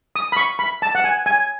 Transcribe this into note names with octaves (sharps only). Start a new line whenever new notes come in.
D#6
B5
C#6
B5
A5
F#5
G#5
G#5